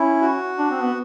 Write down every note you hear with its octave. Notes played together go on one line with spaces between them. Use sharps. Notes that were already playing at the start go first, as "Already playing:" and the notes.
Already playing: C#4 E4
F#4
D4
C4
B3